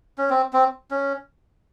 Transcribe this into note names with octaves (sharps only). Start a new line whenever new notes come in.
C#4
C4
C4
C#4